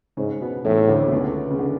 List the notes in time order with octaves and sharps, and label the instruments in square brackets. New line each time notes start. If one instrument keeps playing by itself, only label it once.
[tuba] G#2 [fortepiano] C#3 C#4
[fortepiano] B2 B3
[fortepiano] E2 E3 [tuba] A2
[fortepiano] D2 D3
B2
C#2 C#3
C#3
D3